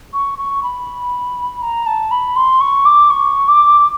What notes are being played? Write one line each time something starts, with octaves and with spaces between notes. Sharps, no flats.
C#6
C#6
B5
A#5
A5
B5
C6
C#6
D6
C#6
D6